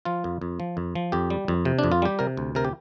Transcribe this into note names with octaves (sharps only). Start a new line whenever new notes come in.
F3 F4
F2
F2
F3
F2
F3
F2 G4
G3
F2
C3
F2 D4
F4
G3 G4
C3 A#4
D2
C3 A#4
G4